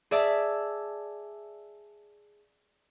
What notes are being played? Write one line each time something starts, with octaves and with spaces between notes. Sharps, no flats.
G#4 D5 E5 A5